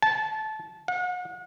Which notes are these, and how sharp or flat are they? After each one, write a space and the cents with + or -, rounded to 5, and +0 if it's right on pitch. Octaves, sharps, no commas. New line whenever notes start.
A5 -20
F#5 -40